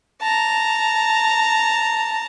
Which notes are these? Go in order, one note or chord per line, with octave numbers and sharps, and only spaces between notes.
A5 A#5